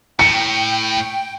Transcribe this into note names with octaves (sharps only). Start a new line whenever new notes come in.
A2 G5 C#7